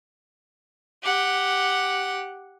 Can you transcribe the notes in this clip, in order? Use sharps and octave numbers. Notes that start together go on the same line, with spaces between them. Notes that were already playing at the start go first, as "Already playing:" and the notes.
G4 F#5